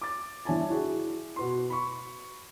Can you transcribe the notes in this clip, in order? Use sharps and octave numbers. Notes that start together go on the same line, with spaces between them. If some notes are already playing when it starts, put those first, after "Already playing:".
D6 A6
G2 E3 C#5 G#5 A5
E4 F#4 G#4
B2 F#4 B4 C6
B5 C#6